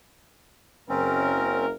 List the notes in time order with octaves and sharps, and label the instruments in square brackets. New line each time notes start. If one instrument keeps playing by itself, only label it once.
[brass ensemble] F#1 A#4 [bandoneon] C4 C#4